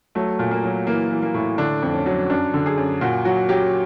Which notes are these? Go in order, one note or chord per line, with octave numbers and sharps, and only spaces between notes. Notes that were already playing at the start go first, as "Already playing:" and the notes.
F#3 A3
A#2
A#3
F#3
E3 A#3
E3
A#3
A2
D3 D4
F2
C#4
F#3
F#2 D4
D3
G#4
F#2
A#2 F#4
F#3 F#4
F#3 G4